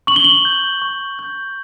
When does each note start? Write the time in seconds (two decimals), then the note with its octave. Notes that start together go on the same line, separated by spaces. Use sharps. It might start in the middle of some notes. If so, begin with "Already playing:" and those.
0.07 C#6 F#7
0.16 G7
0.24 F#7
0.45 G6
0.82 C#6
1.19 G6